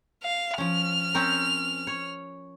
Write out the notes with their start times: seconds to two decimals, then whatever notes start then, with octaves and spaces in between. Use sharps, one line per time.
0.23 F5
0.58 F3 C#4 F6
1.15 C4 C#4 A#4
1.87 C#5